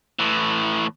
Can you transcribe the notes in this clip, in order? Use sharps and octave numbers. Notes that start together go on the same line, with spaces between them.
A2 E3